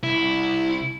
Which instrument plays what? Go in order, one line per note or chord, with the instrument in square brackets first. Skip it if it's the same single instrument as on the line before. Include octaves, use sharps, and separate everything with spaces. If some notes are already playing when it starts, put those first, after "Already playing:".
[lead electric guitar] C2 [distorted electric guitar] E4